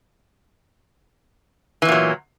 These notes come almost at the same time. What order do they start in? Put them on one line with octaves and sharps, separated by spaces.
E3 E2 A#2 F#3